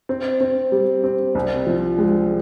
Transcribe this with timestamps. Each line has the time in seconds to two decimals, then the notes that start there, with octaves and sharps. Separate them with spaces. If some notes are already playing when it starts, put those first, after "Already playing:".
0.09 C4
0.41 C4
0.72 G3
1.04 C4
1.35 C2
1.67 F3
1.98 G#3